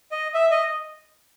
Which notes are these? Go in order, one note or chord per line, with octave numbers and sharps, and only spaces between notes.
D#5
E5
D#5